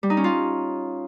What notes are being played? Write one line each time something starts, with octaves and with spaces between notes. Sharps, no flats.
G3
D#4
C#4
F4